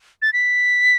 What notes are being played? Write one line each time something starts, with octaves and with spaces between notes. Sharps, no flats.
A6
B6